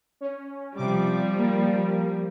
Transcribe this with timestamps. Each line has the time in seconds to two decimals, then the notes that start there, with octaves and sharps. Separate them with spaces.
0.21 C#4
0.77 C3 F3 G3 D6
1.38 A#3